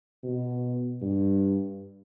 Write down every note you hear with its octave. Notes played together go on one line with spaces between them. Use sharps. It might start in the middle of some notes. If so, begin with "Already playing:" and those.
B2
G2